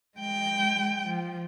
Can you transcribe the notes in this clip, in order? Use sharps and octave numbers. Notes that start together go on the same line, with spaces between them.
G#3 G5
F3